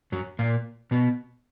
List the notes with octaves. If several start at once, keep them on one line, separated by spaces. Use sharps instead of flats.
F#2 F#3
A#2 A#3
B2 B3